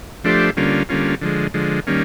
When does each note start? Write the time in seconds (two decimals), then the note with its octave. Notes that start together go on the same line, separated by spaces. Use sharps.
0.24 F3 A3 D4 G4 C5
0.57 D3 G3 A#3 C#4 F4
0.89 D3 G3 A#3 C#4 F4
1.21 D3 F3 G#3
1.54 D3 F3 G#3
1.87 D#3 G3 A#3 C#4